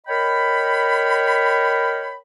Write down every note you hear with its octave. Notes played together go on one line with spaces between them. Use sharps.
A#4 C#5 D#5 G5 B5